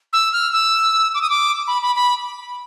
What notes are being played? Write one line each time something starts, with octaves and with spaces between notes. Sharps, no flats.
E6
F6
E6
D6
D#6
D6
B5
B5
B5